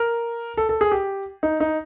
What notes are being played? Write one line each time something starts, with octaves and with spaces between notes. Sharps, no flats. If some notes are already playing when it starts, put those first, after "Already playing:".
Already playing: A#4
A4
A4
G#4
G4
D#4
D#4